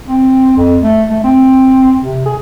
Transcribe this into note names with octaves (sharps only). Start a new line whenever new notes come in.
C4
F2
A3
A3
C4
C3
G#4